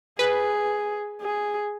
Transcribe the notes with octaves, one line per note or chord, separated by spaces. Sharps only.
G#4 B4
G#4